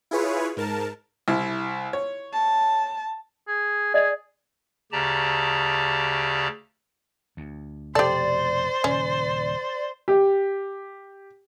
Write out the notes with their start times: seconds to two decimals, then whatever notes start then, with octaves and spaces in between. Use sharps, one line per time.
0.11 E4 F4 G#4 B4 C#5
0.57 G#2 A#4 A5
1.28 C2 E4
1.93 C#5
2.34 A5
3.48 G#4
3.94 G#4 D5 D#5
4.92 D2 C#3 G4 D5 A5 A#5
7.37 D2
7.95 F1 B2 G4 A4 C5 D5
8.84 D#1 C#3 C#4
10.08 G4